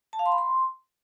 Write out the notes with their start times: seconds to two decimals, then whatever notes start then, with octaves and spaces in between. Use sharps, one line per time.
0.13 A5
0.19 F5
0.26 C6
0.32 B5
0.38 C6